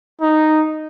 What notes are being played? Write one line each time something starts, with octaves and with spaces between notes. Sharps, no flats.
D#4